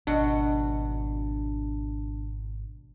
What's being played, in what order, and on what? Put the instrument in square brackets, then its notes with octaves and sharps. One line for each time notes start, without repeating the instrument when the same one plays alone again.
[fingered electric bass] G#1 [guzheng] B2 F#4 [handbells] D4